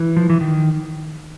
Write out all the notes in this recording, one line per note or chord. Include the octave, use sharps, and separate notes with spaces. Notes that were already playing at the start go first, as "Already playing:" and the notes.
Already playing: E3
F3
E3
D#3